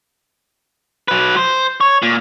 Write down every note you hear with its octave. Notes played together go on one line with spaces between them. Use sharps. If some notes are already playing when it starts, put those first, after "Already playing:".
F#3 B4
C5
C#5
A#2